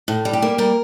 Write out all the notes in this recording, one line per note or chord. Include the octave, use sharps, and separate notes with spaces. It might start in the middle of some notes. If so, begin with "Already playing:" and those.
A2
G3
G4
A#3
G3 A#4